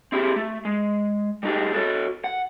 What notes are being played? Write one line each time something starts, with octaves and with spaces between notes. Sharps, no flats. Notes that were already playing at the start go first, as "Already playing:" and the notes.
C4 E4 G4 G#4
A3
G#3
G3 A3 D#4 G4 G#4
F#4 A4 C#5
F#5